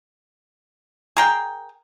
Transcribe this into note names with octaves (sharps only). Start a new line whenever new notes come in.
G#4 A#4 G5